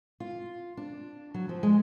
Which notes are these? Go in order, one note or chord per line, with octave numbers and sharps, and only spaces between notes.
F4
D4
F#3
F3
G#3